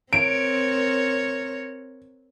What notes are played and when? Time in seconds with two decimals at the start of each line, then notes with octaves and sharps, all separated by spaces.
0.13 C4 A#4 C#5 D7